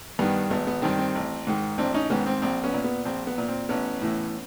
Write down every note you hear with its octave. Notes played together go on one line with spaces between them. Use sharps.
G2 D#3 B3
G#1 B3
B3
G2 D#3 C4
C4
A1
G#2 D#3
A1 C4 D4
C#4 D#4
G#2 D#3 B3 C#4
C4
A#1 C4
B3 C#4
A#2
B3
A#1 C4
B3
A#2
C4
A1 B3 C#4
A2 E3